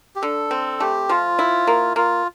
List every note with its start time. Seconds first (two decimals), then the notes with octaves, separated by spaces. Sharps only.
0.16 G4
0.22 D3 A4
0.51 C4
0.80 A3 G4
1.09 F3 F4
1.39 E4
1.67 A#3
1.96 A#3 F4